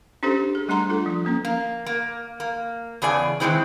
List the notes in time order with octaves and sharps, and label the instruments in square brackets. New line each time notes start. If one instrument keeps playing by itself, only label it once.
[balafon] C#4 D4 G4 A4 C5
G#4
G3 A3 D4 F#5 A#5 C6
A3 F4 A4
F3
F3 A#3 C#4
[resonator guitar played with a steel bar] A#3
A#3
A#3
E2 C#3 G#4 D5 G#5
D#3 E3 G3 G#3 C4 E4